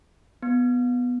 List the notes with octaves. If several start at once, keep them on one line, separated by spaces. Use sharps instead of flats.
B3